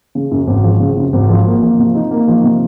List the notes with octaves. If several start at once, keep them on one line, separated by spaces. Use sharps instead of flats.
C#3
F#2
G#1
F3
C#3
F#2
G#1
F3
A#3
F3
C3
D#4
A#3
F3
C3